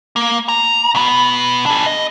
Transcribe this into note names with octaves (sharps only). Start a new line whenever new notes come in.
A#3
A#5
B2 B3
D4 G#4
D#5